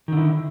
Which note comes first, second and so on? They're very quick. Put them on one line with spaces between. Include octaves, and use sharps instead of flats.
D#3 D3 E4